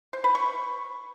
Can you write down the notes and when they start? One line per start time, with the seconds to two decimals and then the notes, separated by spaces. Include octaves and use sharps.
0.13 C5
0.24 B4
0.35 C#6